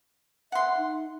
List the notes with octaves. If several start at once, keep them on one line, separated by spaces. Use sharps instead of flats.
E5 F#5 C6
D#4